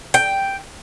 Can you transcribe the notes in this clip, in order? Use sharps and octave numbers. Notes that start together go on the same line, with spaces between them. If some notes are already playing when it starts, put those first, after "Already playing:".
G5